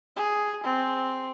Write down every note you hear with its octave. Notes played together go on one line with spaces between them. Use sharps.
G#4
C4